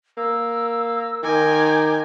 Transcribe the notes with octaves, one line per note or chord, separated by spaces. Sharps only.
A#3 E6
D#3 A#4 G#5 D6 G6